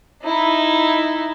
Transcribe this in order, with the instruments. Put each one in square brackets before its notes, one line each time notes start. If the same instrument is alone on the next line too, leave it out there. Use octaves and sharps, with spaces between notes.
[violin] D#4 E4